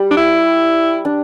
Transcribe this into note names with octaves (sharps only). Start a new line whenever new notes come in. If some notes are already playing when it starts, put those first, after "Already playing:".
Already playing: G3
D4
E4
D4